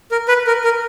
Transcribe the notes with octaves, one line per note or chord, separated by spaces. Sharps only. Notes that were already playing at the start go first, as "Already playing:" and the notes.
A#4
B4
A#4
A#4